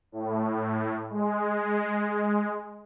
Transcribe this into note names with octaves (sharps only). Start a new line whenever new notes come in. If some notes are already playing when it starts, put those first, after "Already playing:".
A2
G#3